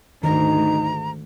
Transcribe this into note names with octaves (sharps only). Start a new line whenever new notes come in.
D2 G#2 D#3 D#4 A#5